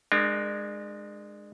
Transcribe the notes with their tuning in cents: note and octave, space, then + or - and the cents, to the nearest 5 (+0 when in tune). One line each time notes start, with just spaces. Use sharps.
G#3 +0 D4 +40 A#4 +0